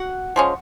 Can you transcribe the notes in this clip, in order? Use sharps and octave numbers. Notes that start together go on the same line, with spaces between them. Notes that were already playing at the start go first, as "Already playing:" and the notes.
Already playing: F#4 F#5
F3 G#3 C#4